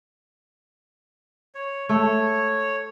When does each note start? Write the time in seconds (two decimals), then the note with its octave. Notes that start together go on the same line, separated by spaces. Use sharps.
1.55 C#5
1.89 A3 C#5